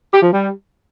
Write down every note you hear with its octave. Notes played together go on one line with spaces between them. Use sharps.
G4
F3
G3